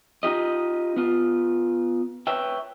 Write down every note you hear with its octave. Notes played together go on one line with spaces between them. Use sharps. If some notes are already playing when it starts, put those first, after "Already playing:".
D#4 F4 G4 D#5
B3 F4
B4 C#5 E5 G5